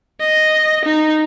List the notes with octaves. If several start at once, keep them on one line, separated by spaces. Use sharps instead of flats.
D#5
D#4